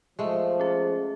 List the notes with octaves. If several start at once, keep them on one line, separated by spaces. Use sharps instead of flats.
F3 G#3 A3
C#4 G#4